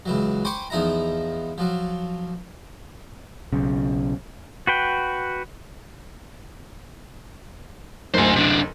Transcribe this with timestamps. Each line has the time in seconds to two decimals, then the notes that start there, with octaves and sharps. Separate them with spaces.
0.06 C#2 E3 F#3
0.45 C5 G5 G#5 B5 C#6 D6
0.70 E2 F3 D#4 E4 A#5
1.58 F3 F#3
3.52 B1 C#3
4.67 F#4 B4 G5
8.14 F#1 D2 C5 G#5
8.36 C3 D4